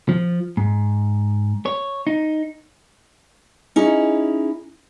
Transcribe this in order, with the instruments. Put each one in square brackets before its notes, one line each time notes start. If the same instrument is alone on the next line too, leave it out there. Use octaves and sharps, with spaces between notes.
[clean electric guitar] F3
G#2
C#5
D#4
[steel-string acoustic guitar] C#4 D#4 E4 G#4